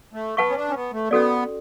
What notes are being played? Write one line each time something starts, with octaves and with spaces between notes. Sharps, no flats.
A3
B3 B4 F#5 A5 C#6
C#4
D4
C#4
B3
A3
B3 C#4 F#4 A4 D5